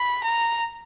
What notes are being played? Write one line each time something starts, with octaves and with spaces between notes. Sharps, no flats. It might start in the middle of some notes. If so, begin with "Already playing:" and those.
Already playing: B5
A#5